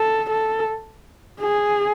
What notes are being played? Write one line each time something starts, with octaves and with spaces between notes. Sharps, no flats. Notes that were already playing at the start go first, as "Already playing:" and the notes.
Already playing: A4
A4
G#4